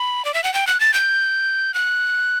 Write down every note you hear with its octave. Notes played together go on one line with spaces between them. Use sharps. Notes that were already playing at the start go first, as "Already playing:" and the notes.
Already playing: B5
D5
E5
F#5
G5
F#6
A6
G6
F#6